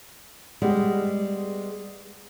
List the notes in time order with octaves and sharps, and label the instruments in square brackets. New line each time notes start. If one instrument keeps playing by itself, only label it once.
[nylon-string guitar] G3 G#3 B3